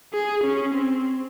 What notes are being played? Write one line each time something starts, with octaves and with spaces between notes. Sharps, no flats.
G#4
C#4
C4